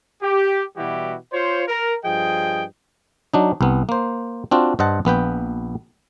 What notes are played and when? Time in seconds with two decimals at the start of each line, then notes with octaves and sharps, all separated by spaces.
0.22 G4
0.76 B2 E3 G3 E4 F#4 G4
1.32 F4 C5 C#5
1.68 A#4
2.04 G2 F3 G#4 D#5 G5
3.34 F#3 D4 D#4
3.61 C2 B3
3.89 A#3 C5
4.51 C4 D4 F4 F#4
4.79 G2 C5 D#5 F#5 A5
5.05 A#1 B3 B4 G5